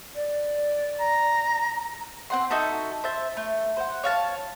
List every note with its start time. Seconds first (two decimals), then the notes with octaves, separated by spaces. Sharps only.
0.15 D5
1.00 A#5
2.30 C4 F#5 C6
2.50 D#4 F#4 A4 E5
3.04 C5 E5 A5
3.37 A3
3.77 C5 F#5
4.04 C#5 F5 A5